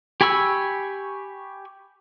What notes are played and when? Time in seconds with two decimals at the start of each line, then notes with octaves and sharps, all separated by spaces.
0.21 G4 G#5 B5 C#6 E6